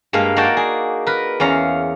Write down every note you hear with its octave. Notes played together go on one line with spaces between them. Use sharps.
G2 G#3 A#3 F5
A#3 D#4 F#4 D5 G5 A5
G#4
A#4 B4
E2 C#4 F5 A#5